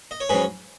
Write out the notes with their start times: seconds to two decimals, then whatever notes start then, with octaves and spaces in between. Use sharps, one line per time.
0.11 D#5
0.20 C#5
0.29 G#2 F#3 C#4 G#4 B4